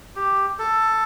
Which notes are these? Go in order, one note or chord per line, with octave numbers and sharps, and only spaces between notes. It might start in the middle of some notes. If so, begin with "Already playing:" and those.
G4
A4